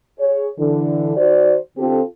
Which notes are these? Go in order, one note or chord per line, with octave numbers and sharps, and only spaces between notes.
G#4 C#5
D3 E3
D#3 F#4 C5 D5
D3 C4 F4 G4 A4